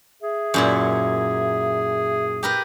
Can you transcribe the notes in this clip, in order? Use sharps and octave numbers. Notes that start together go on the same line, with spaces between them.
G#4 E5
F#2 A#2 E4
G4 A#4 B4